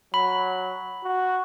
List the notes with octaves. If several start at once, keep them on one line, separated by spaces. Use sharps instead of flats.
F#3 B5
F#4